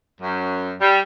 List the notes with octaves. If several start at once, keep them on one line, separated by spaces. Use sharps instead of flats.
F#2
G3